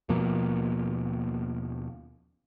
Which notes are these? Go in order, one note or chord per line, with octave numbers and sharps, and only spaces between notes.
D#2 B2 F3 A#3